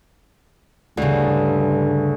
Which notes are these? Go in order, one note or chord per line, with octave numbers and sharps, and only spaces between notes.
D2 G2 C#3